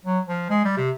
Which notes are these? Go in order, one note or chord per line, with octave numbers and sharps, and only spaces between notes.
F#3
F3
G#3
G3
C3